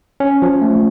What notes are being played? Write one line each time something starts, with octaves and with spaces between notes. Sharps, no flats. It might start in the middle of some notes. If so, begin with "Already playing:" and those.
C#4
F3
A3